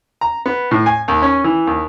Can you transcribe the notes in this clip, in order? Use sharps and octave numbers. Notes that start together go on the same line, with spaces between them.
A#5
B3
A2
G#5
D#2
C#4
E3
D#2